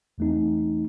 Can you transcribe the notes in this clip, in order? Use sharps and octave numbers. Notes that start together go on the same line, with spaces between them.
E2 E3 A3 C4 D#4